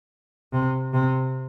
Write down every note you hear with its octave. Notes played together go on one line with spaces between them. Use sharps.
C3
C3